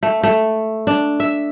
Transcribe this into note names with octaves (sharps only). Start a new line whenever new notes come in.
A3
A3
D4
E5